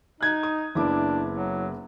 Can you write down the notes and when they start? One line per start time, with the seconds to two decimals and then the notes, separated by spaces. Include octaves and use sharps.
0.21 D#4 F#6 G#6
0.43 D#6
0.75 F#1 B3 D4 E4 D6
1.30 F#3